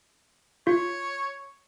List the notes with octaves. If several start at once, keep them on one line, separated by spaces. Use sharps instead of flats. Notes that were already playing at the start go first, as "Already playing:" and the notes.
F4 C#5